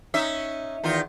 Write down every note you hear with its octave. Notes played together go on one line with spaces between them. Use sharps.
C#4 D#4 E5
E2 D#3 F4